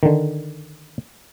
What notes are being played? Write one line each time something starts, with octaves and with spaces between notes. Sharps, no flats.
D3 D#3